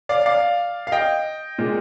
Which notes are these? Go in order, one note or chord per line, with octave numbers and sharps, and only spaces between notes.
D5 F5
D5 F5
F5
D#5 G5
A#2 G#3